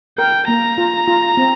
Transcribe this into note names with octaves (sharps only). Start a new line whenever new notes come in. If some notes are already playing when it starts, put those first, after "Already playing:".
A#4 G5
A#3 A#5
F4
F4
C4